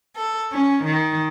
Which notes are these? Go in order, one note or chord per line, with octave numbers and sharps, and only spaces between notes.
A4
C#4
D#3